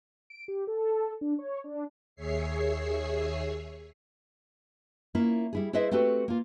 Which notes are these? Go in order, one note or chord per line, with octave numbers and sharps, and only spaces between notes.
D7
G4
A4
D4
C#5
D4
D#2 G#4 C#5 E5 C7
A#3 C#4 E4 F4
G3 E4 G#4
E4 G#4 B4 C5 D#5 E5
A3 C4 F#4 G4 A4 B4
A#3 F4